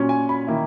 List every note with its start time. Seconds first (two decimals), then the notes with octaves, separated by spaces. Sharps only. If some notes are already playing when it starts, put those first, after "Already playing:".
Already playing: A#2 F#3 C#4
0.09 G#5
0.29 B5
0.47 D#3 A#3 E4